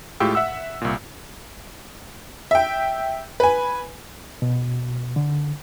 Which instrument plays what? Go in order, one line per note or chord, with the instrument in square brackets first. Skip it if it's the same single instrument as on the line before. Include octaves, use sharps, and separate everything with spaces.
[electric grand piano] A2 G#3 F4 G4 G5 E6
E5 F#5 E6
C2 A#2
[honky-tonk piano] E5 G5
B4 G#5
[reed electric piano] B2
D3